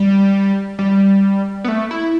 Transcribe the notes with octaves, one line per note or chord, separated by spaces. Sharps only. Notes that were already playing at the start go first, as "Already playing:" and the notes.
Already playing: G3
G3
B3
A3
E4